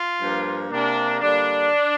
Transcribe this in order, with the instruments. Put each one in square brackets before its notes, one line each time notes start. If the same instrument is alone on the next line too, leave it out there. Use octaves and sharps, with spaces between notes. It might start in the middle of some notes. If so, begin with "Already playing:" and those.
Already playing: [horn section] F4
G2 F3 A#3
C3 A#3 D4
D3 G3 A#3 D4